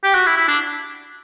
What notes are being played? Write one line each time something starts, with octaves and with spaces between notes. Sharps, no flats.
G4
F#4
E4
E4
D4